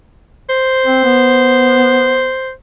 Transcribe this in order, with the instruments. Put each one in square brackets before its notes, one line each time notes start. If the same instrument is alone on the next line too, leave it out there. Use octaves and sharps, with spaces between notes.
[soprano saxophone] C5
[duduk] C4
B3